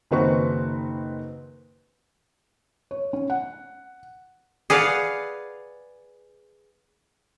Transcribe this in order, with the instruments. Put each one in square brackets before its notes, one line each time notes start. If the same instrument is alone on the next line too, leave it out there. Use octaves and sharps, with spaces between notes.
[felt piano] F#1 D#3 C4 F#4 B4 C#6
C#5
C#4
F#5
[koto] G#4 B4 D5 F5 F#5